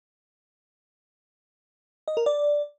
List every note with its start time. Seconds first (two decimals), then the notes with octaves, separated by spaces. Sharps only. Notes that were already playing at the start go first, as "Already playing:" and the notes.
2.08 D#5
2.17 A#4
2.26 D5